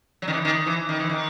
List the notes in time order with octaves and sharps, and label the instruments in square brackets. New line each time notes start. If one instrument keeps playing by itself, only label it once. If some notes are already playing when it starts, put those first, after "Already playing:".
[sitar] F#3
D#3
E3
D#3
E3
D#3
E3
D#3